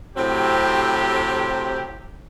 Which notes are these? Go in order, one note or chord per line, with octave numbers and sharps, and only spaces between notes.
A2 C3 F#3 C4 G4